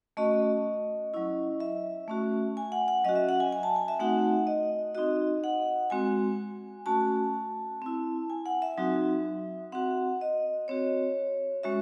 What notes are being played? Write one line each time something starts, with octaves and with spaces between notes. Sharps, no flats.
A3 C#4 F#4 D#5
F#3 C#4 E4
E5
A3 C#4 F#4
G#5
F#5
F#5
F#3 C#4 F#4 D#5
E5
F#5
G#5
G#5
A5
G#5
E5
A3 C4 D#4 F#4 F#5
D#5
C4 D#4 F#4 D#5
F#5
G#3 C4 F#4 G#5
A3 C#4 F#4 A5
C4 E4
G#5
F#5
E5
F#3 C4 D#4 F#4
C4 F#4 F#5
D#5
C4 F#4 C#5
G#3 C#4 F#4 E5